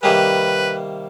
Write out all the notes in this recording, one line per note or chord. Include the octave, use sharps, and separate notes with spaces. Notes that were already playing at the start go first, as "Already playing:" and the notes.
C3 D#3 G3 A#3 G#4 B4